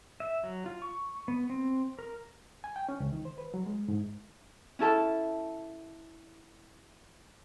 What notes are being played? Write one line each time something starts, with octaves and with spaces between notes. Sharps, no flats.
E5
F#3
F4
C#6
B3
C4
A#4
G#5
G5
C#4
C#2
D#3
C5
B4
F#3
G#3
G#2
C#4 E4 A4 A5